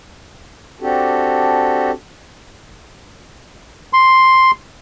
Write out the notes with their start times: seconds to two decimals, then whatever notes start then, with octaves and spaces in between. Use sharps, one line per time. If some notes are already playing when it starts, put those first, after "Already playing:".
0.81 C4 D4 F#4 G4 A4
3.93 C6